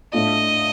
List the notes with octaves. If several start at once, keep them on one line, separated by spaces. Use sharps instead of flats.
A2 A3 D4 F4 D#5